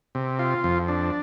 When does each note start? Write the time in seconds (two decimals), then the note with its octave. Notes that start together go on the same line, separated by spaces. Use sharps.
0.15 C3
0.39 F4
0.64 F2
0.88 D4